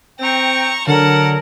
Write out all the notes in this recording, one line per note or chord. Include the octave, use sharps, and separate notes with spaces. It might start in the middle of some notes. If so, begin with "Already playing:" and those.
C4 G5 A#5 C#6
D3 F#3 A#4 F#5 A5